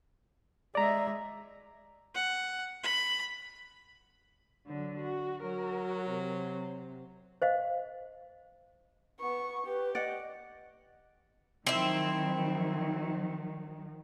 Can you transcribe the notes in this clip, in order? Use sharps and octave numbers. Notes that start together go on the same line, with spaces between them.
G#3 D5 E5 A#5
F#5
B5
D3 F#3
F#4
F#3 F#4 A#4
C3
C5 D#5 F5
B3 C#6
G4 B4
D5 D#5 F#5
D#3 F3 F#3 C4 E4